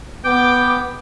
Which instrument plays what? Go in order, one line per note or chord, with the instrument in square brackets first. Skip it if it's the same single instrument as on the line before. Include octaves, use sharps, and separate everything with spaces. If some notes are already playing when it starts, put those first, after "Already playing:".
[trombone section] B3 [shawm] G5 [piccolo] D6